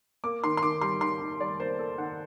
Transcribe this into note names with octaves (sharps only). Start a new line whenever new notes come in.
A#3 D6
D#3 C6
C6
D#3 D6
G3 C6
D#3 C6
D#3
G3 D5
A#3 C5
A#3 A4
D#3 F#5